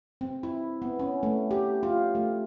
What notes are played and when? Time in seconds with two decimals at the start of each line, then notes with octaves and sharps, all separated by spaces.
0.21 C4
0.43 E4
0.82 B3
0.99 C#4
1.23 A3
1.51 G4
1.83 F4
2.15 A3